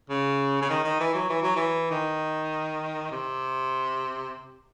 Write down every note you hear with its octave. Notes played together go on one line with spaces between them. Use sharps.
C#3
C#3
D#3
D#3
E3
F#3
E3
F#3
E3
D#3
C3